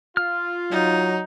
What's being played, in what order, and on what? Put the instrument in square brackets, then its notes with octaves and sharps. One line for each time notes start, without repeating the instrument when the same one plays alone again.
[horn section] F4 [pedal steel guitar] F6
[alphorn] F#3 [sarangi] D#4